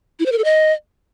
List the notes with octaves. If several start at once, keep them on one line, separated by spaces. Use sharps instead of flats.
E4
C5
A#4
A4
D#5